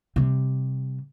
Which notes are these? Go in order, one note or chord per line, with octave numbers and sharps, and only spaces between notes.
C3 G3